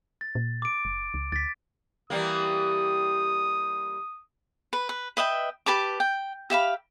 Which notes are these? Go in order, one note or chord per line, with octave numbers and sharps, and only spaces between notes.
A6
A#2
D6 D7
F#1
C#2
D2 A6 B6
E3 G3 A#3 D#6
B4
B4
B4 D#5 E5 G5
G4 B4 A5 D6
G5
G4 E5 F5 B5